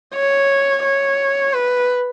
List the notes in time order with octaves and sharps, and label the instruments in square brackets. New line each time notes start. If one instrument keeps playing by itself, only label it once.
[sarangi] C#5
C#5
B4